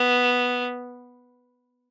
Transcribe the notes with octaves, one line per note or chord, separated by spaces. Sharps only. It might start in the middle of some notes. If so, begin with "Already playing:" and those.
Already playing: B3